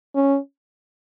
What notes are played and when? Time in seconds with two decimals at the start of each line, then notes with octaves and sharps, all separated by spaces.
0.15 C#4